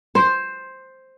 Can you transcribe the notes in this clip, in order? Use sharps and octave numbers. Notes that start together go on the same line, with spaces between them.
C5